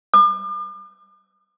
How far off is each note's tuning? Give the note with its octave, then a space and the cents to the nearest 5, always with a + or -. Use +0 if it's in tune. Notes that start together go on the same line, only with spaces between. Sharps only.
D6 +40